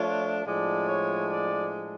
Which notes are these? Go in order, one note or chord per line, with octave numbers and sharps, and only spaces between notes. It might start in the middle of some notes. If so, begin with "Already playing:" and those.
Already playing: F3 A3 D4 F4 C#5
A2 F3 G#3 D4 D5
C#5
D5